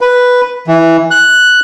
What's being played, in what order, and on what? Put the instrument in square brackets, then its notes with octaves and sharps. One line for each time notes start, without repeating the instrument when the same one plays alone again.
[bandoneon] B4
E3
F#6